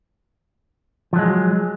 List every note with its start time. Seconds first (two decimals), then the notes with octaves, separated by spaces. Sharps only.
1.13 F3
1.16 F#3
1.19 G#3